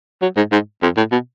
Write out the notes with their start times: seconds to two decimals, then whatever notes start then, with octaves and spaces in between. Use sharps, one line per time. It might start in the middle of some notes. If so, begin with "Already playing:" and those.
0.22 F#3
0.37 G#2
0.52 G#2
0.83 F2
0.97 A2
1.12 B2